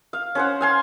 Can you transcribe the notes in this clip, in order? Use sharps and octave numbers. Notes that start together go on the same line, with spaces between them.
F5
C#4 C5 F#5
F5 G#5 C6